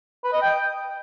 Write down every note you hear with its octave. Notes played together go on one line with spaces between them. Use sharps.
B4
D#5
G5